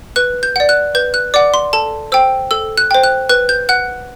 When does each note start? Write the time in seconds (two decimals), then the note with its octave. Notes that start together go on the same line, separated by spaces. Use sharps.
0.16 B4 F#6
0.43 G6
0.56 D5 F#5
0.69 F#6
0.95 B4 G6
1.14 F#6
1.34 D5 F#5 D6
1.54 C6
1.73 A4 A5
2.12 C5 G5 E6
2.51 A4 E6
2.77 F#6
2.91 C5 G5
3.04 F#6
3.29 B4 F#6
3.49 G6
3.69 F#5 F#6